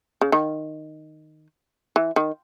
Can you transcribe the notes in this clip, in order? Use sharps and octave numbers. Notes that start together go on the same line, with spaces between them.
C#3
D#3
E3
D#3